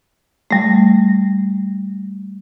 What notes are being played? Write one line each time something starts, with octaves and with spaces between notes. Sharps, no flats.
G3 A3